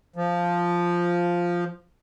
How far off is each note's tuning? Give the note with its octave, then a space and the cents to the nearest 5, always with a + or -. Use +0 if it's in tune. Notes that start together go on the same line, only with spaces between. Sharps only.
F3 +0